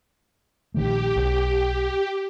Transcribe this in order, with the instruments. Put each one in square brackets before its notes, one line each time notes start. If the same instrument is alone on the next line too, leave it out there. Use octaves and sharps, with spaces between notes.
[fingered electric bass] A#1 D#3 A3 [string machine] G4
[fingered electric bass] B1